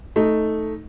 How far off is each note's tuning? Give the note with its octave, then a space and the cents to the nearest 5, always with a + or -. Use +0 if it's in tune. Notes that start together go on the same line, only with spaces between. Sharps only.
A3 +0 D#4 +5